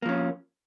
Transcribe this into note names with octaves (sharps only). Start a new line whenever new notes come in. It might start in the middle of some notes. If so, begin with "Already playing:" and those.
F3 A#3 C#4